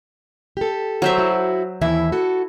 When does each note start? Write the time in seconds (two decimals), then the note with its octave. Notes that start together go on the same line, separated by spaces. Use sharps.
0.57 G4 A4
1.02 F#3 C5 E5
1.18 E4 F#4
1.81 D#2 E3 E4 E5
2.12 F#4 A4